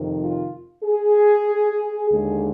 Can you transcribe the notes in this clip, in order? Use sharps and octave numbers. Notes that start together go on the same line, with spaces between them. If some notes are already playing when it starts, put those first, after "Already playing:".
Already playing: F2 C3 D#3
F4
G#4
D#2 D3 G#3 G#4